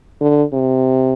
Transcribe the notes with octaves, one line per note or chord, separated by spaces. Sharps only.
D3
C3